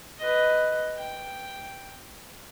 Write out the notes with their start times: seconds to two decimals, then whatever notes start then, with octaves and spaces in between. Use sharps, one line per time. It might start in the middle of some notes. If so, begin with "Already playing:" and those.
0.19 B4 D#5
0.95 G5